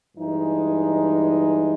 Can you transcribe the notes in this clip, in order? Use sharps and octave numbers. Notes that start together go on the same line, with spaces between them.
G2 E3 G#3 D#4